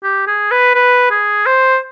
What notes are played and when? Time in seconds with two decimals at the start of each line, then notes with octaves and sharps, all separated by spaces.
0.03 G4
0.27 G#4
0.51 B4
0.75 B4
1.11 G#4
1.46 C5